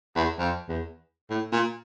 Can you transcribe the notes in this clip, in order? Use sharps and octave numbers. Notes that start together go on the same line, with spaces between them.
E2
F2
E2
A2
A#2